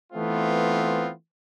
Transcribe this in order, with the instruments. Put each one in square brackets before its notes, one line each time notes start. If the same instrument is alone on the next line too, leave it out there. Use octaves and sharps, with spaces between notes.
[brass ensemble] E3 A3 B3 C4 F4